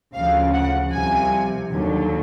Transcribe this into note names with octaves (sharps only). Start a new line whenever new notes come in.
D2 C#3 F3 F5
F#5
C2 C3 F3 G#5
D#2 D3 F#3